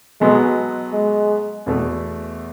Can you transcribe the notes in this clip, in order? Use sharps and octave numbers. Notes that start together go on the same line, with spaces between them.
B2 F#3 G#3 B3 F#4 A4
G#3
E2 B2 A3 E4